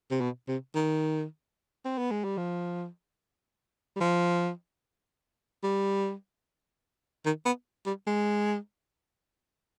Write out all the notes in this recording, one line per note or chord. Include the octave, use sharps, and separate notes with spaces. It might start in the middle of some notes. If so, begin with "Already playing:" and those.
C3
B2
C3
D#3
C4
B3
G#3
G3
F3
G3
F3
G3
D#3
B3
G3
G#3